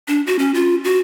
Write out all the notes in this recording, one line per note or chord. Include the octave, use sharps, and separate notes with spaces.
D4
F#4
C#4
F4
F#4